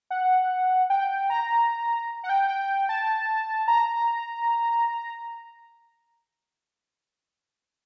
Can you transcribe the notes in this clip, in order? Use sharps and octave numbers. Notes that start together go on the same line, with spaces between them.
F#5
G5
A#5
F#5
G5
G5
A5
A#5